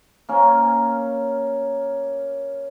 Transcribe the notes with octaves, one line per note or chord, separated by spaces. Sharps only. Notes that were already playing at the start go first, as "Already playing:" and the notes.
A#3 C#4